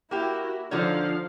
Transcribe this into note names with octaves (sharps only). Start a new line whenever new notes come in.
A#3 E4 F#4 G4
D3 F3 D#4 C#5 F5